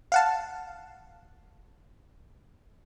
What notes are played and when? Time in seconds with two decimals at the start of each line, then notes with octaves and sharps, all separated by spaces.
0.12 F5 F#5 A5